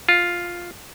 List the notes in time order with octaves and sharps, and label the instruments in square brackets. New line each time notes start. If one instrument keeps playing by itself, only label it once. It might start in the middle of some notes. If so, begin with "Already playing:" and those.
[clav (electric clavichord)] F4